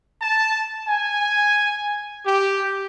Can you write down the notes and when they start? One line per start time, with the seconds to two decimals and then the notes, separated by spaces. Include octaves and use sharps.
0.22 A5
0.89 G#5
2.26 G4